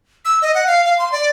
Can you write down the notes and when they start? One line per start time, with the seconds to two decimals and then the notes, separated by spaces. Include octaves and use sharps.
0.25 E6
0.42 D#5
0.54 F#5
0.67 F5
0.85 F5
0.98 C6
1.12 D5